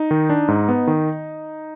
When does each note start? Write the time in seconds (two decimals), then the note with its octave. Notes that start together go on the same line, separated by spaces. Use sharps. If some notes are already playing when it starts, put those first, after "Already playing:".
Already playing: D#4
0.11 D#3
0.30 D4
0.48 G#2
0.68 B3
0.87 D#3